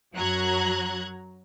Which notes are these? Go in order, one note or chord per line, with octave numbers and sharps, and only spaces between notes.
F#2 F#3 F#4 A#5 F#6 G#6